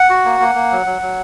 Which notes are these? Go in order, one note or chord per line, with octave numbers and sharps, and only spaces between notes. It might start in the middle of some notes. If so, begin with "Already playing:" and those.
Already playing: F#5
F#4
A#3
A#3
A#3
F#3
F#3
F#3